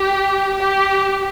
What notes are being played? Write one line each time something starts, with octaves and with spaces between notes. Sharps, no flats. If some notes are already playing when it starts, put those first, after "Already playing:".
Already playing: G4
G4